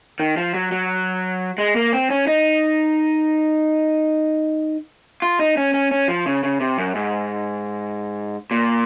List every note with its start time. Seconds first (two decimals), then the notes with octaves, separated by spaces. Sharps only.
0.20 D#3
0.37 F3
0.54 F#3
0.72 F#3
1.58 G#3
1.76 A#3
1.93 C4
2.10 C#4
2.27 D#4
5.22 F4
5.39 D#4
5.57 C#4
5.74 C#4
5.91 C#4
6.08 F3
6.26 C#3
6.44 C#3
6.60 C3
6.78 F#2
6.95 G#2
8.51 A#2